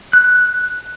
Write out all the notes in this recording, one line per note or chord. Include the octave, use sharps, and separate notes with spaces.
F#6